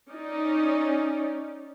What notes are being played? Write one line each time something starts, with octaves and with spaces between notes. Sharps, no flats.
C#4 D#4 D5